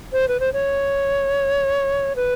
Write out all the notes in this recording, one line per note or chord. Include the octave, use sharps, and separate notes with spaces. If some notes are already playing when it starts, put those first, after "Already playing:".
C5
B4
C5
C#5
B4